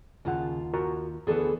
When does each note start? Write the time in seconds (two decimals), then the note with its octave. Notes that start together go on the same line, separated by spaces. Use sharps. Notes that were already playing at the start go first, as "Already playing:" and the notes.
0.25 D#2 C#3 F4 F#5 A5
0.74 F#4 A#4 A#5
1.27 D2 E3 B3 G#4 A4 A5